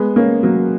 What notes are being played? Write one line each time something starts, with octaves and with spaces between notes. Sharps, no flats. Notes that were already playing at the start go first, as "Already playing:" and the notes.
Already playing: G#3 B3
A#3 C#4
F#3 A#3